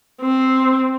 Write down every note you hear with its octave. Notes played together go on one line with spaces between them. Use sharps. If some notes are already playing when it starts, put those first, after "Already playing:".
C4